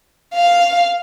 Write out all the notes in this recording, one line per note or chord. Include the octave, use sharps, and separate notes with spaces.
F5